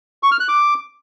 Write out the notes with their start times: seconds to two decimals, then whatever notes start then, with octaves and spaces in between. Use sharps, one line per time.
0.23 C#6
0.31 F6
0.40 F#6
0.48 D6